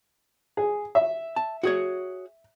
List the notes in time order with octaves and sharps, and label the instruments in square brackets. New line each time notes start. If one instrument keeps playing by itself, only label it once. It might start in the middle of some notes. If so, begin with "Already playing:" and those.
[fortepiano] G#4
E5
[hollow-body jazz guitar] A5
F#4 G#4 C#5